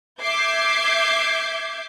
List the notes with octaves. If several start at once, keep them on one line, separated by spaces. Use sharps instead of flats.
E5 D6 G6 G#6 C7